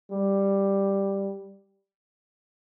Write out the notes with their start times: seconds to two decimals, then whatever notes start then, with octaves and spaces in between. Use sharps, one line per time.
0.11 G3